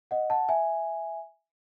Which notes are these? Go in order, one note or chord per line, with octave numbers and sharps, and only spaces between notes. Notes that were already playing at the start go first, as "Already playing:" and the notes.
D#5 F#5
F#5 A5
E5 G#5